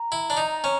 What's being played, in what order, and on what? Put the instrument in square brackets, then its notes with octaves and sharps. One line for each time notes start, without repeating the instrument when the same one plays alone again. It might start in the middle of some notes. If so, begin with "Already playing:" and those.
Already playing: [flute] A#5
[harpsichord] E4
D4
D#4
C#4